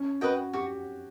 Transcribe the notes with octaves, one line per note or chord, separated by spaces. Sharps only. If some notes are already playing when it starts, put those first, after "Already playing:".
Already playing: C#4
F#4 B4 D#5 G5
F#4 G4